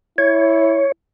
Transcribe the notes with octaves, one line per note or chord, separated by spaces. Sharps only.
E4 C#5